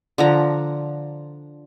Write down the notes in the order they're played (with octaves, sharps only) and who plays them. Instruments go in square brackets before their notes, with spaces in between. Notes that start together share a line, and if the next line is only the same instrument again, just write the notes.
[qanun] D3 F3 A#5